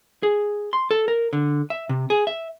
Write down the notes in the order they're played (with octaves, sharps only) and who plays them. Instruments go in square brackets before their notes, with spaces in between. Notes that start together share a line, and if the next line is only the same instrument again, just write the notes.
[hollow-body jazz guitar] G#4
C6
A4
A#4
D3
E5
C3
G#4
E5